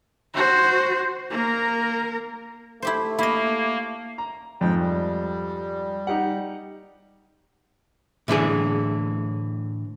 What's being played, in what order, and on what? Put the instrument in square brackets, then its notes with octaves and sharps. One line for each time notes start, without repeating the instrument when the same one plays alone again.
[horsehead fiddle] F#4 C5
A#3 A#4
[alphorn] A3 [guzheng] E4 G4 C5
[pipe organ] A#3 [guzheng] E4 D#5
[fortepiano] A#5
[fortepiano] F2 G#2 [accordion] G5
[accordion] G3
[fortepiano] D#4 G4 F#5
[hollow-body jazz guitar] A2 D3 E3 G#4